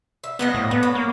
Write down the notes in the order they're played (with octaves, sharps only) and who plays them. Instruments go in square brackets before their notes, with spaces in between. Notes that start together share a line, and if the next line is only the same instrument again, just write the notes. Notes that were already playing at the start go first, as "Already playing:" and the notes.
[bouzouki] E5
[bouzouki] F3 F#3 D#5 [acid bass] B3
[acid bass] A2
[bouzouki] A2 [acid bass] B3
[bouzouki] F#3
[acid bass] A#3